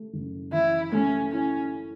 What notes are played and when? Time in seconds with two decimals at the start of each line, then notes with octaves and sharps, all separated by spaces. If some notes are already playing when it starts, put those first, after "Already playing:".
Already playing: A3
0.13 F#1
0.52 E3 E4
0.92 A3 C#4
1.32 C#4 E4